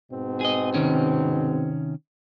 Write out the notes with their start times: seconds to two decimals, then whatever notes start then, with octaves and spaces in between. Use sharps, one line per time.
0.11 G#2 B2 C4
0.41 G#4 D#5
0.74 C3 D#3 C#4